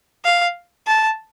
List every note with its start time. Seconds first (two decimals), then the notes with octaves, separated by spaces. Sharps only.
0.25 F5
0.87 A5